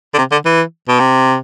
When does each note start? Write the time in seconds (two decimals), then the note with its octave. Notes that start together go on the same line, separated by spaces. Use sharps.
0.14 D3
0.18 C3
0.32 D3
0.45 E3
0.88 B2
0.99 C3